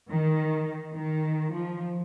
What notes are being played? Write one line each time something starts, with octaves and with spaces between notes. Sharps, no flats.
D#3
D#3
F3